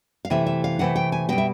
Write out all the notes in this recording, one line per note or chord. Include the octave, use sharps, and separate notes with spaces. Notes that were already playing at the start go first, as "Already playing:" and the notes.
F5
C3 E3 A3 E5
E5
F5
C3 E3 A3 F#5
G5
G#5
B2 G3 G5
E5